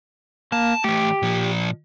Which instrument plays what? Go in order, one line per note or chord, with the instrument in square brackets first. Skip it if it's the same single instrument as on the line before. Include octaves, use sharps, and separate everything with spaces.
[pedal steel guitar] A#3 [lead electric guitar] A5
[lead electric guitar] E3 A3 [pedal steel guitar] G4
[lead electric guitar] A#2 F3